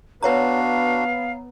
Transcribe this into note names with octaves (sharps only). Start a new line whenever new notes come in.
B3 D4 F#4 B4 C#5 F5 A#5